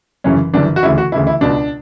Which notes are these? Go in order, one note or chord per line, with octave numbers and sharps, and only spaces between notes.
G1 F#2 C#3 E3 C#4
G1 F#2 C#3 E3 D4
F#4
D2 C#3 E3 E4
F#4
D2 C#3 E3 E4
E4
C#2 B2 D4